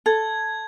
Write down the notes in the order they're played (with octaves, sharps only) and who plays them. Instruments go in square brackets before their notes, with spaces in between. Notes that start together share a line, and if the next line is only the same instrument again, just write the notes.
[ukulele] A4 [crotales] G#6